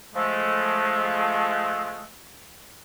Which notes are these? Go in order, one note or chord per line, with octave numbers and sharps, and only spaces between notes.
F3 G#3 A3